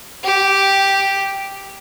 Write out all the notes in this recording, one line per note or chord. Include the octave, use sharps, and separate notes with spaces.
G4